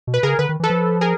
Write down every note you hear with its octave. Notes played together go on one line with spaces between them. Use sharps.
B2
B4
C#3 G#4 A#4
D3 B4
D#3
E3
A4 B4
F3
G#4 A#4